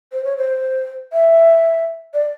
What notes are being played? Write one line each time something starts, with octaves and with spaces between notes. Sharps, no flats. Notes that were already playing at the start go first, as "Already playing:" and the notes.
C5
C#5
C5
E5
D5